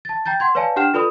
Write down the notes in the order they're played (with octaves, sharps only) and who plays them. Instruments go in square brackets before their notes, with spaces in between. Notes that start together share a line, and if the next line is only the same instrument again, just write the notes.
[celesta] A5 A6
G5 A#5 G6 A6
F#5 C6 G#6
B4 C#5 D5 F5 G#5 A5
D4 G4 F#5 G5 F6 E7
F4 A4 B4 D5 B5 D#6